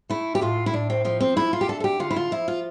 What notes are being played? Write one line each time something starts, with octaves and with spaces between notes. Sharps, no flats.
A3 E4
G4
A2 F4
E4
A2 D4
C4
F3 C4
C4
A3 E4
F4
G4
D3 A4
A4
G4
D3 F4
E4
F4
F3 E4
F4